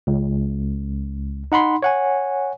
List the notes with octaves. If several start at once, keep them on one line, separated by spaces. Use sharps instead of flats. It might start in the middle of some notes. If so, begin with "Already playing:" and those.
C#2
D#4 F#5 B5 C6
C#5 F#5 G#5